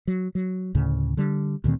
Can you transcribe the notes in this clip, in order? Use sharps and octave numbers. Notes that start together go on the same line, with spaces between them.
F#3
F#3
D2 A2 C#3
D3 G3
D2 A#2 D#3 C4